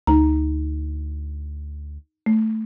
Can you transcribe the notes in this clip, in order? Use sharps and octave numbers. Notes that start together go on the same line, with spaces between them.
D2 D#4 A#5
A3